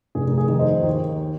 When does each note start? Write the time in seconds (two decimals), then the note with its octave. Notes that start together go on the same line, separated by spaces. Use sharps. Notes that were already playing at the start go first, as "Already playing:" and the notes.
0.15 F1 G#4
0.29 A#4
0.38 G#4
0.48 D#3
0.59 C5 D#5
0.82 D#2